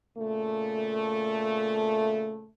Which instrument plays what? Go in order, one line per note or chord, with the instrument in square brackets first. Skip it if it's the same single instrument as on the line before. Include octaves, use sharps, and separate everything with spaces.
[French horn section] A#2 C#3 A3